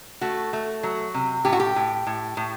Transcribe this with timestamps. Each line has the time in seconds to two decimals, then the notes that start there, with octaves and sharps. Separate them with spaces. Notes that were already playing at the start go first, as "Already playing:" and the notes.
0.21 A3 F#4
0.53 A3
0.83 F#3
1.14 C3
1.45 A2 G4
1.53 F#4
1.60 G4
1.76 A2
2.07 A2
2.37 A2